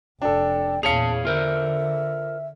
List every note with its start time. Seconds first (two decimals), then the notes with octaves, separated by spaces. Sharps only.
0.22 F1 D4 A4 G5
0.83 E2 A#2 G#4 C#5 F5 A5 C#7 F7
1.25 D3 F4 A#4 C5 E5